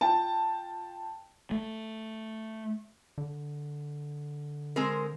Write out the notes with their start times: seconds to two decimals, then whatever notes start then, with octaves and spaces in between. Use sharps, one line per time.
0.01 F4 G5 A5
1.51 A3
3.18 D3
4.76 G#3 C4 A#4